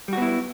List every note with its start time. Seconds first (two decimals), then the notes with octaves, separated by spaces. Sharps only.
0.08 G3
0.13 F#4
0.17 B3
0.22 E4